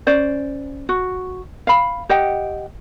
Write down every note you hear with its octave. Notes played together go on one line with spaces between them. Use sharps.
C#4 C5 D5
F#4
F5 B5
G4 D#5 F#5 G5